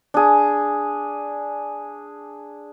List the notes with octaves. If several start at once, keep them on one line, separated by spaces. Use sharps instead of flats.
D4 G#4